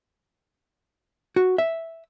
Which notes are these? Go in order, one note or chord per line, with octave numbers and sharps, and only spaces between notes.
F#4
E5